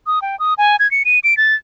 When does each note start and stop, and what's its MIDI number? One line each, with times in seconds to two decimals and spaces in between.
0.07 0.22 87
0.22 0.38 79
0.40 0.54 87
0.58 0.76 80
0.79 0.90 92
0.91 1.03 97
1.05 1.19 99
1.24 1.36 98
1.37 1.55 93